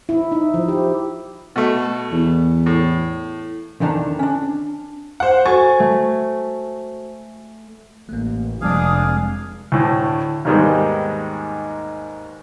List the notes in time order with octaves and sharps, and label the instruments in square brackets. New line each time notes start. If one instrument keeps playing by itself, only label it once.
[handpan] E4
D#4
F3
G4
[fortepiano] B2 A3
[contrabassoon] E2
[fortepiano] A2
[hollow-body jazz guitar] E2 D3 D#3 D4 A5 A#5
C#4 D4
[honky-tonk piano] C5 F#5
[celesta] F#4 A4 C5 [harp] G#5 [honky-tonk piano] C#6 A6
[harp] A3
[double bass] A1 [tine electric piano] A3 A#3
[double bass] F1 [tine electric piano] F3 G3 G#3 [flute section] D4 D#6 [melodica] G#4 F5
[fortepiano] D2 A2
D#2 G#2 D#3 G3 G#3 B3